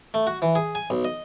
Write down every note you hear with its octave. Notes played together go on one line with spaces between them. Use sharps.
A3
F#4
E3
G#4
G#5
B1
D#5